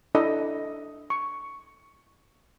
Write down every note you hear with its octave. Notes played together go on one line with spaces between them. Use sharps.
D4 E4 A4 D#5
C#6